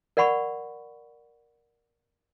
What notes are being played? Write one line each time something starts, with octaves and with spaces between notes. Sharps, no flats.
A#4 D5 F#5 B5 C#6